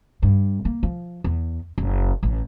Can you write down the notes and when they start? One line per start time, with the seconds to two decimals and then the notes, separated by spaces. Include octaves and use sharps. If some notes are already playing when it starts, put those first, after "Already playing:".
0.23 G2
0.65 A#3
0.83 F3
1.24 E2
1.78 F#1
2.23 A1